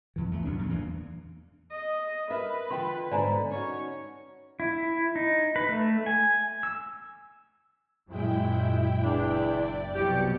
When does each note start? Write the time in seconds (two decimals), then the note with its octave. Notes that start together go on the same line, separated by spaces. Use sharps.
0.16 F2 E3
0.31 E2 A3
0.44 C2 F#3 B3 D4
0.58 A1 F#2 A#2 D3
0.70 E2 E3 A#3 D4
1.72 D#5
2.30 A#4 B4 D#5 E5
2.70 D3 F4 G5 C6
3.11 G#2 B2 D3 D5 G#5 A#5
3.51 C#4 D#4 F#4 C#5
4.60 E4
5.16 D#4
5.56 B4
5.69 A3
6.06 G#5
6.63 E6
8.09 F#2 A#2 G#3 E4 G5
9.04 F#1 E2 D4
9.49 D5
9.94 C2 B2 F#3 G3 G4 C#7